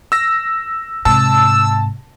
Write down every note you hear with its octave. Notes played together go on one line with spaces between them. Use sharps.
E6 A#6
G#2 C3 A5 E6